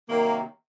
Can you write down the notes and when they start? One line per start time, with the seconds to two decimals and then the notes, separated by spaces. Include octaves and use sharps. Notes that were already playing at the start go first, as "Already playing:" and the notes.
0.09 C3 D#3 F#3 A#3